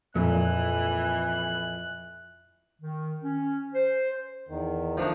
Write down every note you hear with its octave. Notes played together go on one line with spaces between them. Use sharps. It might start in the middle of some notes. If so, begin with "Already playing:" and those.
F2 A#2 E3 F#6
D#3
C#4
C5
E2 D#3
F3 A3 D4 D#4